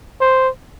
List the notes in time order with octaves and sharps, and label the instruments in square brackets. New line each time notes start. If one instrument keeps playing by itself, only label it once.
[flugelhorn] C5